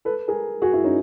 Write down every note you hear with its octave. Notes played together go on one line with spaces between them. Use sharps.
A4 B4
G#4 A#4
F#4 G#4
E4 F#4
C#4 D#4